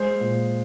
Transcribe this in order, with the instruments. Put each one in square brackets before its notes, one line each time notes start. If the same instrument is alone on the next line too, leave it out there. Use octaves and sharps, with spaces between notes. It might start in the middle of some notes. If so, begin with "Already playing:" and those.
Already playing: [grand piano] G#3 C5
A#2